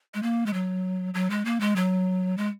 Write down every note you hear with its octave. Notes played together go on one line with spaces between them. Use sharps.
G#3
A#3
G#3
F#3
F#3
G#3
A#3
G#3
F#3
G#3